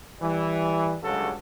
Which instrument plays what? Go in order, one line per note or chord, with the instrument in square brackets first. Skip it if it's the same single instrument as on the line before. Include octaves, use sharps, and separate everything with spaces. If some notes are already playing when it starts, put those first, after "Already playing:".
[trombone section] E3 G3
C#2 G2 F#3 A4